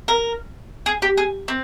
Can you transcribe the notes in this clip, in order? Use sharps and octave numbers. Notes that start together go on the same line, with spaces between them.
A#4
G#4
G4
G#4
C4